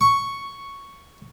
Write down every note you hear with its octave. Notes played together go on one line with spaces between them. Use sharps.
C#6